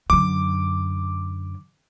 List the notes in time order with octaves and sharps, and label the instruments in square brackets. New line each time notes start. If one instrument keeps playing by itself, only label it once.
[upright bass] F#2 D3 [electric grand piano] D6